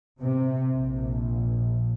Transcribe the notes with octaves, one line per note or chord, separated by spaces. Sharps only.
C3
A#1